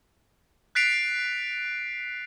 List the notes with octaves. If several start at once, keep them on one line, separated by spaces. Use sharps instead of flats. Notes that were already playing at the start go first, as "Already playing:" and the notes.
F#6 A6 B6 C7 D7 F7